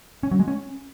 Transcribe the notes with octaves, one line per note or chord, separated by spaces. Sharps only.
C#4
F#3
G#3
C#4